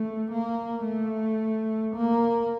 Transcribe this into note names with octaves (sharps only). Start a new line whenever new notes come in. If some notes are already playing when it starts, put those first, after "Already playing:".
Already playing: A3
A#3
A3
A#3